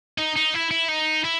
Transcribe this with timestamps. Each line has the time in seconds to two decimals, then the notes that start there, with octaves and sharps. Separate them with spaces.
0.18 D#4
0.36 D#4
0.54 E4
0.71 E4
0.89 D#4
1.25 E4